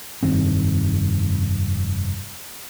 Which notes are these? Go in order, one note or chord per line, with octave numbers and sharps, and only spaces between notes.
F1 G2 D#3 C4